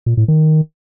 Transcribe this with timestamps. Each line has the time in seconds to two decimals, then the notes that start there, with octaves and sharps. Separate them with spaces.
0.06 A#2
0.17 A2
0.28 D#3